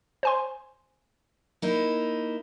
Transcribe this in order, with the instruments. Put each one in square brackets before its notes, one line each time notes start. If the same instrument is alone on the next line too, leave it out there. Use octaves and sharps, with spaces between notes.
[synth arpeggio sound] C5 G#5 C6
[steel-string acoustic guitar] A#3 D#4 E4